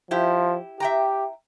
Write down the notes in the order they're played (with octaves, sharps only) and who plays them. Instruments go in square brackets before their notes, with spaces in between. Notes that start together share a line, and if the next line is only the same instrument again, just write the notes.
[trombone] F3 [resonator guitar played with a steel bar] E4 G4
[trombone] G4 [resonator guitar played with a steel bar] E5 G5 A#5